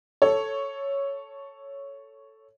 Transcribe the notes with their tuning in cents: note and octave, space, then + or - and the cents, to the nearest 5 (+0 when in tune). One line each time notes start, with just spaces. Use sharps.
A4 +0 C#5 +0